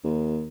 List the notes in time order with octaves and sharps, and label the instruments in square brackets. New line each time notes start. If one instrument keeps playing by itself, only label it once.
[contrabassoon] D#2